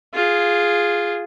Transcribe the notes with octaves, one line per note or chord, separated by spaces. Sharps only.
F4 G#4